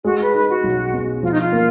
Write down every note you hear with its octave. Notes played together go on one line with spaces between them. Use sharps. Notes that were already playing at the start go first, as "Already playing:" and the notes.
G#3 F#4
B4
D#4 B4
F#4
B1
B2
F3 F4
D#4
F4
A#3